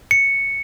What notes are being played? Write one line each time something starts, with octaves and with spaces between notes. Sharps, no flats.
C#7